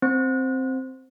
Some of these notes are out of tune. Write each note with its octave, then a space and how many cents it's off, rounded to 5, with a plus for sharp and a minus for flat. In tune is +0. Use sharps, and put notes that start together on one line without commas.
C4 +0 C5 +0